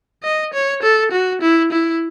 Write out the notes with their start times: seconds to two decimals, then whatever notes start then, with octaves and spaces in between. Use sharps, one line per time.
0.23 D#5
0.53 C#5
0.83 A4
1.12 F#4
1.41 E4
1.72 E4